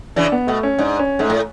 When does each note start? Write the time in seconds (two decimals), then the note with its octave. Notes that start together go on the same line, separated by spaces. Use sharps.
0.16 C#3 E3 D4
0.32 B3
0.47 B2 A3
0.63 C#4
0.79 G#2 D4
0.99 C#4
1.19 G#2 A3
1.30 A2